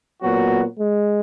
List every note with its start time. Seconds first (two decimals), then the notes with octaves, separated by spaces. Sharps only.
0.22 A#2 F#3 B3 F#4
0.79 G#3